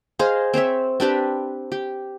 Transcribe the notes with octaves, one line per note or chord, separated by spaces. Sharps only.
G#4 C5 D#5 F5
C4 C5 C#5 E5
C4 D4 G4 B4
G4